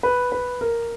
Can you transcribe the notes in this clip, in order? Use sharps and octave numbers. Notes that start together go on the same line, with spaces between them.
B4
B4
A#4